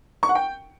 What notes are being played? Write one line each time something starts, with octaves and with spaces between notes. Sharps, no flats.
C#6
F#5
G5